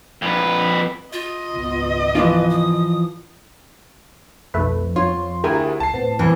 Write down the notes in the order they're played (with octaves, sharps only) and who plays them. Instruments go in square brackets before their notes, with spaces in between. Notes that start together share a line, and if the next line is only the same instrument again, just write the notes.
[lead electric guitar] F2 B4
[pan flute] F4 [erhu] D#5
[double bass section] G#1 C#2 B3
[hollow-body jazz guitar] E3 F3 F4 [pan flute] B4
[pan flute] D#6
[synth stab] B1 A3 B4 [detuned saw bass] F2
[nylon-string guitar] F4 [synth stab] C#5 [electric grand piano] C6
[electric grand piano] D2 E4 G#4 [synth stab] G4 A#4 G#5
[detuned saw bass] C#2 [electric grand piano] A5 C7
[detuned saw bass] A2 [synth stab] B3 C4
[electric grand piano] C2 C3 [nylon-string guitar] E3